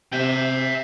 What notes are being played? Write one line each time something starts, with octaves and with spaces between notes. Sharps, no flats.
C3 E5 G5